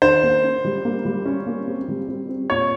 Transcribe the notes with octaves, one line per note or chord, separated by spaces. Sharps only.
D#3 C5
A#3
C#4
G3
A#3
G3
C#4
A#3
C4
G3
C4
C4
A#2 C#5